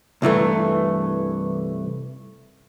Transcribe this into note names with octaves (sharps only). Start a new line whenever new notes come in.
C2 G2 E3 A3